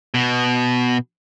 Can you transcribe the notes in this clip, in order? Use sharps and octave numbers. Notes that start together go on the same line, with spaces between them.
B2